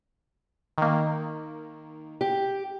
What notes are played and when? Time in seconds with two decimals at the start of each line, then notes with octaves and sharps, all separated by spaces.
0.78 D#3 A#3
2.21 G4